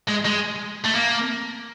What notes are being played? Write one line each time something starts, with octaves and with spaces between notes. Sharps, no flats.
G#3
G#3
A3
A#3